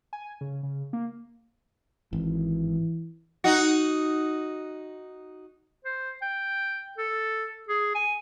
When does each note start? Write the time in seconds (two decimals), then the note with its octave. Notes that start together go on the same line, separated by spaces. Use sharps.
0.13 G#5
0.41 C#3
0.63 C#3
0.93 A#3
2.13 G#1 E3
3.44 D#4 F#4
5.85 C5
6.22 G5
6.98 A4
7.68 G#4
7.95 G#5